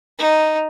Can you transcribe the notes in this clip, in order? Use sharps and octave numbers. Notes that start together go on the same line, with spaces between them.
D#4